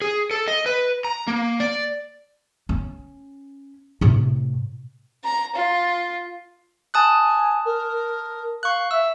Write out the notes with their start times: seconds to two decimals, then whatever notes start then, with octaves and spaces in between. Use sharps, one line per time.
0.02 G#4
0.31 A4
0.48 D#5
0.66 B4
1.05 A#5
1.27 A#3
1.60 D5
2.69 C#4
4.01 A2 C3
5.24 A#5
5.55 F4
6.94 G#5 A5 D#6 F#6
7.65 A#4
8.63 F5 C#6 F#6
8.91 E5 E6